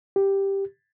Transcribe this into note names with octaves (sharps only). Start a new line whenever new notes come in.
G4